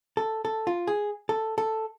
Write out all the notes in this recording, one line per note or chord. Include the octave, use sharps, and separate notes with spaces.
A4
A4
F4
G#4
A4
A4